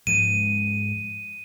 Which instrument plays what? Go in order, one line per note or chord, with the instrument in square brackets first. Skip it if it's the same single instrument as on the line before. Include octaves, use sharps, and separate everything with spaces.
[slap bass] G#2 F3 G#3 [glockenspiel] D#7